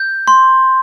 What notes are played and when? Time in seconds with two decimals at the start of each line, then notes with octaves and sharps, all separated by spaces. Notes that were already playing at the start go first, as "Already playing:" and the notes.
Already playing: G6
0.28 C6